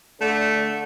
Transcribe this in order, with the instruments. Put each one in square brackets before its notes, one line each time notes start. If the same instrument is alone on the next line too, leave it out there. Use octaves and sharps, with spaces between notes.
[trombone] D3 [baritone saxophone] A3